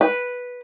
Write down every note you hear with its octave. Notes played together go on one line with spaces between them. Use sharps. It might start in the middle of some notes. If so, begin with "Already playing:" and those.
B4